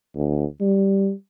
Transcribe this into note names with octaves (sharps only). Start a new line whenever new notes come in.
D2
G3